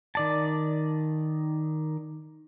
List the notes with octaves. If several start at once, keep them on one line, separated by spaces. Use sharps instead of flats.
D#3 D5 A5